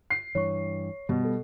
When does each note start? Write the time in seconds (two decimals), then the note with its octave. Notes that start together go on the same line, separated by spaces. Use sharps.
0.10 C7
0.35 G2 E3 C#5 C#6
1.09 B2 G3
1.25 A4